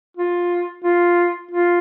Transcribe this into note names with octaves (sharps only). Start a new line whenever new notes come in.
F4
F4
F4